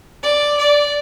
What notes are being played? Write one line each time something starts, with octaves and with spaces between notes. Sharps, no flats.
D5
D5